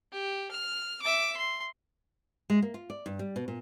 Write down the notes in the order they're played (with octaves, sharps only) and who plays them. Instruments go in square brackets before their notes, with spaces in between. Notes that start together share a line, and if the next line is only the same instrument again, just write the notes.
[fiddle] G4
F6
E5 D6
C6
[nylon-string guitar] G#3
A#3
F4
D5
G2
G3
B2
A#2